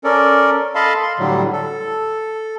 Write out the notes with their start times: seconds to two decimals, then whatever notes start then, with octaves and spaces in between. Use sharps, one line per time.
0.04 C#4 A4 A#4 D5
0.75 A4 D#5 F5 A5 B5 C6
1.03 C6
1.19 A2 D3 F#3 G3
1.53 A4